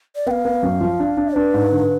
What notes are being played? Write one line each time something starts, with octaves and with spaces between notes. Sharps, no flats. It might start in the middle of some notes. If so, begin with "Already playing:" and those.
D5
B3 F5 G5
B3
F#2
F3
D4
D4
D4 B4
G#2
D3